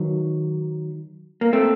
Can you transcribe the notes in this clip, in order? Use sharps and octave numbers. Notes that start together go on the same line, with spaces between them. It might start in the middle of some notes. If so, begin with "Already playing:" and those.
Already playing: D#3 F#3
A#3
A3 C4